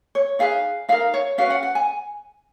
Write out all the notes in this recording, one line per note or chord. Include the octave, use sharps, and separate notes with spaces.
C#5
D#4 G#4 B4 F5
D#4 A#4 F5
C#5
C#4 F#4 B4 F5
F#5
F#5
G#5